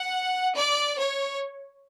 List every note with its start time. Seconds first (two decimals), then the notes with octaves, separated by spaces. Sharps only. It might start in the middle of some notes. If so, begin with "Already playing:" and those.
Already playing: F#5
0.57 D5
0.99 C#5